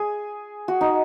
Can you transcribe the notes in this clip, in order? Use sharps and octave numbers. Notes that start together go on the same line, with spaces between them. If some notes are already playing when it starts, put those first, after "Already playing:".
Already playing: G#4
F#4
D#4